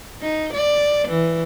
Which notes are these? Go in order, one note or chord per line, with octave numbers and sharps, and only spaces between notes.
D#4
D5
E3